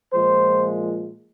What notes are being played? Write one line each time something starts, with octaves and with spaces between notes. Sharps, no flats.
A#2 F3 G#3 C5